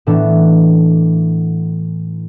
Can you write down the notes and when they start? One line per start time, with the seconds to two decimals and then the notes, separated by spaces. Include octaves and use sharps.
0.07 A2 E3 B3 D4